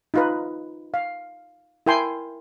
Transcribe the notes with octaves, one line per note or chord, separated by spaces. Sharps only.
D#4 F4 B4
F5
E4 A#4 G5 G#5 C6